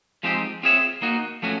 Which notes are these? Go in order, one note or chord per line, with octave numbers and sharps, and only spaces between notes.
F3 G#3 C4 D#4 G4
C4 F4 G#4 C#5 E5
A#3 D#4 F#4
F3 A3 C#4 F#4